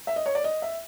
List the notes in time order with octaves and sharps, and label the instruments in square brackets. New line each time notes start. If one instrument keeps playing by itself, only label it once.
[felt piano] E5
D#5
C#5
D5
D#5
E5